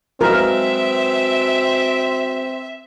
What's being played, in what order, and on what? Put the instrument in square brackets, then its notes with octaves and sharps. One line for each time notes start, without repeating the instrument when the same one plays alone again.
[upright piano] F#3 G#3 B4 [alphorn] C4 [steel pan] A#4 [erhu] E5